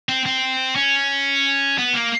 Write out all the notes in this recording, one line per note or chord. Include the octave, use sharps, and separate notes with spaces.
C4
C4
C#4
B3
A#3